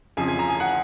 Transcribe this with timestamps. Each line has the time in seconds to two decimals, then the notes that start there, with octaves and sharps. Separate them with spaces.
0.17 F2 C#3 F3 G#5
0.28 G#5
0.39 A#5
0.50 G#5
0.60 F#5